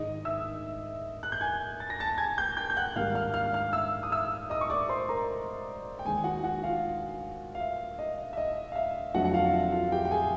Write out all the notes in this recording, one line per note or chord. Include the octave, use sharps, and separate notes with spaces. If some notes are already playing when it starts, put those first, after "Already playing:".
Already playing: G#2 D#3 G#3 D#5 D#6
E5 E6
F#6
G6
G#5 G#6
A6
A#6
A5 A6
G#5 G#6
G5 G6
G5 G6
G6
F#5 F#6
G#2 D#3 G3 A#3 F5 F6
F5 F6
F5 F6
F5 F6
E5 E6
D#6
E5 E6
D#5 D#6
C#6
D5 D6
C5 C6
A#4 A#5
G5
D#2 D#3 G#3 G#4 G#5
F#4 F#5
F#4 F#5
F4 F5
F5
E5
D#5
E5
D#5
F5
E5
F2 D3 F#3 A3 F#4 F#5
F#5
F4 F5
E5
F4 F5
G4 G5
G5
G#4 G#5